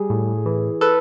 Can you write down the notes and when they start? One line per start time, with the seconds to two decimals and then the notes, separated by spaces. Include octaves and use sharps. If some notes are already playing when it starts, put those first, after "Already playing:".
Already playing: G3 G#4
0.10 A2
0.46 E3
0.81 A4 B4